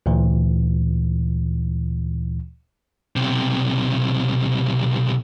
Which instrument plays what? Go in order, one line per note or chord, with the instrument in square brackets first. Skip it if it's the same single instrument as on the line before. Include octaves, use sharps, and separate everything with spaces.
[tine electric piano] D2 A#2 E3
[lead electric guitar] B1 C3